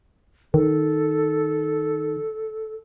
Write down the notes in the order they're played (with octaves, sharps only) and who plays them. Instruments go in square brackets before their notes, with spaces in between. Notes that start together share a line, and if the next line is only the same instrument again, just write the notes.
[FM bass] D#3 [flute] A4